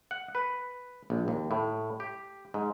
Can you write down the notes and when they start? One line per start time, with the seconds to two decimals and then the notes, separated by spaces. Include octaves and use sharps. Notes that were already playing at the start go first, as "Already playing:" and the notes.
0.11 F#5
0.35 B4
1.10 A#1
1.28 D#2
1.51 A2
2.00 G4
2.54 G#2